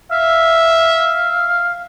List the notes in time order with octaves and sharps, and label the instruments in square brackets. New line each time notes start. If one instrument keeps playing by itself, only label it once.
[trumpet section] E5 [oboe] F5